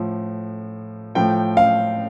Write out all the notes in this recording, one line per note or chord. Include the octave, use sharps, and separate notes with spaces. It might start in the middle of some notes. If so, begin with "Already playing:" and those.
Already playing: A2 F3
A2 F3 G5
F5